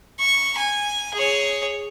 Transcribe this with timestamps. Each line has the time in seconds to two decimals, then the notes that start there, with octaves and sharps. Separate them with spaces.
0.20 C#6
0.58 G#5
1.14 G#4 C#5